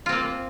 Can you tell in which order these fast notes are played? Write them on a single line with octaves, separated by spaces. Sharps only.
F4 C4 A#3